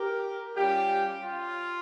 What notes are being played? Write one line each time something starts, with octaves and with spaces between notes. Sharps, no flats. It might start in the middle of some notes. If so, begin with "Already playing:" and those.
Already playing: G4 A#4
G3 C#4 F4 G4
F4